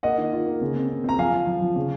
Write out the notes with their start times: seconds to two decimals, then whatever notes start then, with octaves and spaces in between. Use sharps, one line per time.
0.03 A#3 D#5 F#5
0.18 D#3
0.32 F4
0.47 A#3
0.61 C#3
0.76 C4
0.90 C4
1.04 C4 A#5
1.18 F3 F5 G#5
1.33 F3
1.47 F3
1.62 F3
1.76 C#3